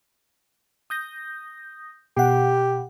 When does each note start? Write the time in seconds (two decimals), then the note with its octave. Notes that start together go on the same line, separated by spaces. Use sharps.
0.90 D#6 G6 A#6
2.17 B2 G4 F#5